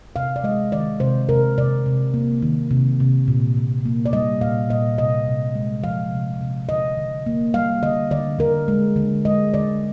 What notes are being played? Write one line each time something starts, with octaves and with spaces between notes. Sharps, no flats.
C3 F5
D5
G#3 D#5
D#3 D5
C3 C5
C3 A#4
C3 D5
C3
A#3
D#3
C3
C3
A#2
A#2
A#3
D5
G3 D#5
A#2 F5
A#2 D#5
C3 D#5
C3
G#3
F3 F5
C3
C3
D3 D#5
D3
A#3
G3 F5
D3 D#5
D3 D5
D3 A#4
G#3
D3
G#3 D#5
D3 D5